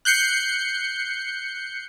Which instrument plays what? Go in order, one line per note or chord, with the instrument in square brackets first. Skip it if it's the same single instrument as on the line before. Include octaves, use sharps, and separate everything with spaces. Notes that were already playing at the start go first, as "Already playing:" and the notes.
[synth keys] F#6 G6 C7 C#7